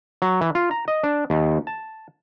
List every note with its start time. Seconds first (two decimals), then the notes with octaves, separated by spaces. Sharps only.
0.22 F#3
0.41 E3
0.55 F4
0.71 A#5
0.88 D#5
1.03 D4
1.30 D#2
1.67 A5